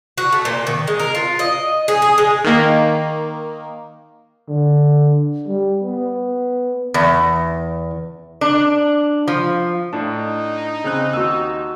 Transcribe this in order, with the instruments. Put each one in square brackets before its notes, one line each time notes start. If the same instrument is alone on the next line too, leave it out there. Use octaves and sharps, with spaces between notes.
[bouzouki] F#4
A3
A#2
D#3
G#3
A#4
F4
D#5
G#4
G#4
G#3
[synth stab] D#3 A#3
[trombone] D3
G3
B3
[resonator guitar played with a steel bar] E2
D4
F3
[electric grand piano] A2 D4 [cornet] D#4 [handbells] A5
[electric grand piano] C#3 C4 F#6
[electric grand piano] D#2 [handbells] F#4 E6